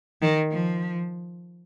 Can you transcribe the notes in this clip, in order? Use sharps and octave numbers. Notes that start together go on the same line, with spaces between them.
D#3
F3